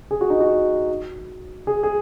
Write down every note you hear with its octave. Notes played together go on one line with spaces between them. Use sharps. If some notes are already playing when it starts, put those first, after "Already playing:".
G#4
F#4
D#4
F#4
G#4
G#4